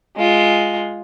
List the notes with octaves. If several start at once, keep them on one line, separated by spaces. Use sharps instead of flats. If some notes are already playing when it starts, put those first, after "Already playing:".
G#3 F4